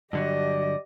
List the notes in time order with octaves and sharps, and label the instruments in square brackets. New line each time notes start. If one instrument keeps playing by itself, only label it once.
[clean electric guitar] G2 D3 F#3 [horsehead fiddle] G4 D#5 [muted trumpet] D5